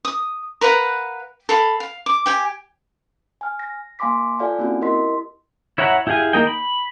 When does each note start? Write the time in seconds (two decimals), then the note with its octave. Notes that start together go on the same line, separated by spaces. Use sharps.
0.05 D#6
0.61 A#4 B4 F5 F#5
1.49 A4 F5 B5
1.80 F5
2.06 D6
2.26 G4 G5 G#5
3.41 G#5 F6
3.59 A#6
3.99 A#3 F5 G#5 C6 D6 B6
4.39 F4 A4 D5 F5 G#5
4.59 A#3 C4 C#4 E4 F#4
4.82 E4 G4 A#4 D#5 C6 B6
5.78 E4 C#5 E5 F#5 A#5
6.07 E4 G4 G#4 F5 G#5
6.33 A#3 D#4 A#4 D#5 G5
6.47 B5